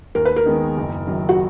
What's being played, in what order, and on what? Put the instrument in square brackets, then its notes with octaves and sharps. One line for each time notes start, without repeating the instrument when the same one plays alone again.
[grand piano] D#2 [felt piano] A#4
[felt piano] B4
A#4
[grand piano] D#3 G#3 B3 D#4
F#1
F#2 D#3 F#3
[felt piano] F#4